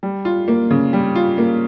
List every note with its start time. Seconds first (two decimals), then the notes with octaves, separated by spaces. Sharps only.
0.03 G3
0.25 F4
0.48 A#3
0.71 C#3
0.93 G3
1.15 F4
1.38 A#3